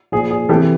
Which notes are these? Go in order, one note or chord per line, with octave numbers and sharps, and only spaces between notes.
A#2 F3 G#4
G#4
C3 E3 G4 A4